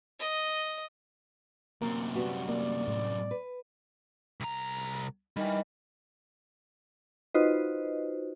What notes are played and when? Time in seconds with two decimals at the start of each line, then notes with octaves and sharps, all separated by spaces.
0.20 D#5
1.82 F#2 C3 A#3 A#4
2.15 G3 B3 F#4
2.49 A#3 D5
2.88 A2
3.31 B4
4.40 C2 A#5
5.37 D#3 E3 G3
7.34 D#4 F4 F#4 B4 C5 D#5